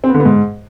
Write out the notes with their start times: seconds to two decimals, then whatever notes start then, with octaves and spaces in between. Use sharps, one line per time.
0.04 C4
0.09 B3
0.14 D3
0.20 B3
0.25 G#2